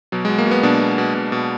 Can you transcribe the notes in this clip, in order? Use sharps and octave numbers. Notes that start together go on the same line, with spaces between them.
B2 F#3
G#3
B2
A#3
B2
B3
B2 D4
B2
B2
B2
B2